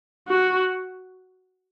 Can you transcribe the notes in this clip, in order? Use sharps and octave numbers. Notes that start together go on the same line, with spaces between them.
F#4